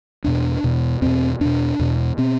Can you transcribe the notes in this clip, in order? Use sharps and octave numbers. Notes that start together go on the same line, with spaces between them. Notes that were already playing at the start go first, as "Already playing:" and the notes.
E2 B2 D4
E2 B2
E2 B2 C4
E2 B2 D4
E2 B2
B2 C4